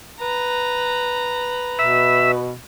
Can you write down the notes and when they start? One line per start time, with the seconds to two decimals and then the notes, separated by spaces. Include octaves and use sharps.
0.21 B4 A#5
1.79 B2 E5